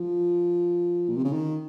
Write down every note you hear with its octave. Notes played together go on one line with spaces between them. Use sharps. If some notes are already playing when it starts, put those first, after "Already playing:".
Already playing: F3
A#2
C3
C#3
D#3